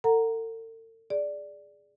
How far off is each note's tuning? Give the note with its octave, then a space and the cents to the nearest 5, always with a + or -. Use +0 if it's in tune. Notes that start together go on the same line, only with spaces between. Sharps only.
A4 +45 F#5 +0 A#5 +0
G#4 +0 D5 +0